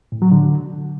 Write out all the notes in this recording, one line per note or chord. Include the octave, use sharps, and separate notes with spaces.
A2
F#3
D3